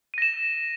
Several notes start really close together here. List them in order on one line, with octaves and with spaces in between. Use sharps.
D#7 A#6 E7